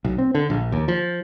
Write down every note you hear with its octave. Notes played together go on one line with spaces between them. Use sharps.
B1
C4
D3
A#1
D#2
F3